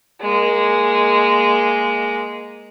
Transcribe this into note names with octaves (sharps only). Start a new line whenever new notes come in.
G#3 A#3